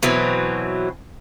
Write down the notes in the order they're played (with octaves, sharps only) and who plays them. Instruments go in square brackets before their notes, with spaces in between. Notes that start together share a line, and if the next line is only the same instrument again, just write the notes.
[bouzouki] B2 E3 F#3 C4